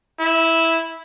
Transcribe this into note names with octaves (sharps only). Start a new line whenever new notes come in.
E4